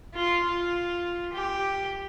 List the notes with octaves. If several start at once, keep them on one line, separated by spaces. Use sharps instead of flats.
F4
F4
G4